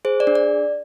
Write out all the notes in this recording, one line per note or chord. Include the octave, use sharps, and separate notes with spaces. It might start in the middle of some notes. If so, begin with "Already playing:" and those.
G#4 C5
D5
D4
D5